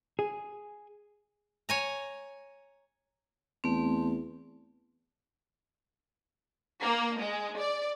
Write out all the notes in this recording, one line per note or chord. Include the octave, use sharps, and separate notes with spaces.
G#4
C#5 G#5 A#5
E2 A3 C4
A#3
G#3
D5